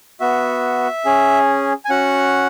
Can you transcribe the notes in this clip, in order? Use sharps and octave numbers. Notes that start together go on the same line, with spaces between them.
B3 F#4 E5
C#4 G#4
G#5
C#4 F#4 F#5